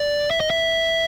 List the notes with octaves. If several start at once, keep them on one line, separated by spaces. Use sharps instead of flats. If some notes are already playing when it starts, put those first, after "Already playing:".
Already playing: D5
E5
D#5
E5